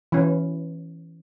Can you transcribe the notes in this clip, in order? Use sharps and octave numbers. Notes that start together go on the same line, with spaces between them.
E3 C#4